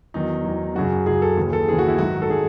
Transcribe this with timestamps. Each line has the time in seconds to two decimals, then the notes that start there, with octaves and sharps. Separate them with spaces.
0.14 E2 D#3 F#3 D#4
0.44 E2 D#3 F#3
0.75 F#2 C#3 F#3 F#4
1.06 F#2 C#3 F#3 G#4
1.22 A4
1.37 D#2 C#3 E3
1.53 A4
1.68 D#2 C#3 E3 G#4
1.79 F#4
1.88 E4
1.98 G#2 D#3 F#3 F#4
2.22 A4
2.30 D#3 F#3 G#4